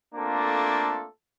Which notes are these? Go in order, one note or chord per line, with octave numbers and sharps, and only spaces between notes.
A3 A#3 C4 D4 F4 A4